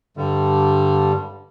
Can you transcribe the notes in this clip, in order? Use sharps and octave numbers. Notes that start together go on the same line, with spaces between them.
G2 D3 G3